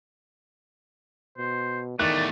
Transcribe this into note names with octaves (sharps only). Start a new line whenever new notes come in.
B2 C5
E2 D#3 A3 D5 F#6